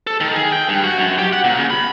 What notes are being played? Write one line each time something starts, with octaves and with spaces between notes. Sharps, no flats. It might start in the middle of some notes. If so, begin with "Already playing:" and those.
A4
D#3
G#4
G5
G2
F#4
F#2
G4
F#5
A#2
C#3
B5